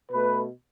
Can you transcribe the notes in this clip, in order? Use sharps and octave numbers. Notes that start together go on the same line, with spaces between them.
B2 A3 B4